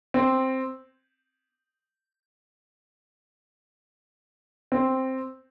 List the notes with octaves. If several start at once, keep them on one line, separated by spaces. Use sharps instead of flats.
C4
C4